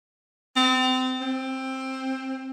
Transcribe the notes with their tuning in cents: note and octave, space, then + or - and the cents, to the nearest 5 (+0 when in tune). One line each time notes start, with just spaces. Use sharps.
C4 -30
C4 +15